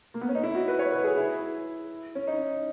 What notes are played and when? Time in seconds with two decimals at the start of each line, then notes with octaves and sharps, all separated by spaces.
0.14 A#3
0.21 B3
0.29 C#4
0.35 D#4
0.43 E4
0.54 F#4
0.68 B4
0.79 C#5
0.92 B4
1.04 G#4
1.17 E4
2.15 C#4
2.27 D#4